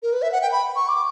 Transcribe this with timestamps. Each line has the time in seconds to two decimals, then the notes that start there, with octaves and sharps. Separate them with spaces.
0.03 A#4
0.13 B4
0.22 E5
0.32 F#5
0.42 G5
0.52 B5
0.76 C#6
0.89 D6